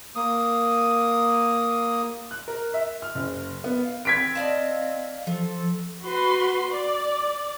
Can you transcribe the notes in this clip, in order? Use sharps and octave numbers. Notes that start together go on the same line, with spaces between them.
A#3 D#6
F#6
A#4
E5
F6
F#1
B3
F5
C4 G#6 B6 D7
D5 D#5 F5 A5
F3 F4 A4
F#4 B4 C6
D5